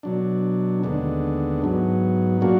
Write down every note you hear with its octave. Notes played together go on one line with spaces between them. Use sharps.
B2 F#3 D4
D#2 D3 G#3 B3 D4
G#2 F#3 B3
A#2 F#3 A#3 D4 F#4